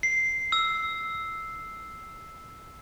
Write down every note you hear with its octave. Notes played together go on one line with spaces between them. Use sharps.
C7
E6